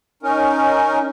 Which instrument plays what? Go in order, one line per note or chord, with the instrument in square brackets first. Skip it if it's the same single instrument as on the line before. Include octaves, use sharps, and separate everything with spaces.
[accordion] C#4 D#4 A#4